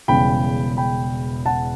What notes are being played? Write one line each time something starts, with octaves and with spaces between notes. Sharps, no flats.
E1 E2 C#3 G3 G5 B5
G5 B5
F#5 A5